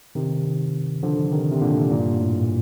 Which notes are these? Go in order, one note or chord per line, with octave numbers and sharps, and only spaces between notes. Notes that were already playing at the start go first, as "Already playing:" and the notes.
C3 D#3
D3 F3
C3 D#3
C3
A#2 D3
G2 A#2
A2